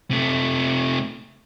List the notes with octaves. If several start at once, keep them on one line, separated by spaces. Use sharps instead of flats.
C3 A3